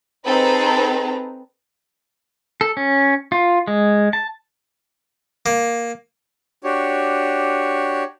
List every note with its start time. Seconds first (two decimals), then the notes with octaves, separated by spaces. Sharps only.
0.25 C4 D#4 G#4 A4 B4 A#5
2.61 A4
2.77 C#4
3.32 F4
3.67 G#3
4.13 A5
5.46 A#3
6.64 D4 F#4 G4 C#5